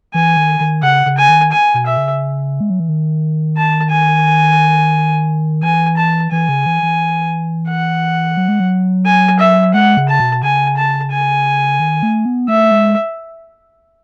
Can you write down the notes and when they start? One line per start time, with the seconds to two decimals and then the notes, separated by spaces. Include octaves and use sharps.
0.14 E3 G#5
0.37 D#3
0.60 D#3
0.83 C#3 F#5
1.06 C#3
1.18 G#5
1.29 D#3
1.52 G#5
1.74 B2
1.86 E5
1.97 C#3
2.61 G#3
2.70 F#3
2.80 E3
2.88 D#3
3.57 A5
3.91 G#5
5.62 E3 G#5
5.97 A5
6.32 E3 G#5
6.49 C#3
6.66 E3
6.83 E3
7.69 F#5
8.37 F#3
8.48 G#3
8.60 F#3
9.05 G#5
9.39 E5
9.74 G#3 F#5
9.97 C#3
10.09 A5
10.20 B2
10.43 C#3 G#5
10.77 A5
11.11 G#5
11.80 D#3
12.03 A3
12.25 B3
12.48 A3 E5
12.71 G#3